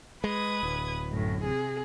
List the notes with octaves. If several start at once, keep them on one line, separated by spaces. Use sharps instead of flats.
G#3 B4 D#6 G#6
D1
F#2 A2
C3 G#4